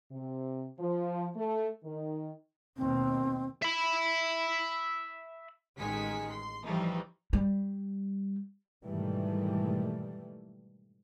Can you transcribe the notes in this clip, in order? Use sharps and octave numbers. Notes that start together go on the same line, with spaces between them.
C3
F3
A3
D#3
D#2 B2 C4
E5 B5
A1 D#3 G#3 G#5 B6 C#7
C6
E3 F3 G3 A3 D#4
G3
G#2 B2 D#3 E3 G3 A3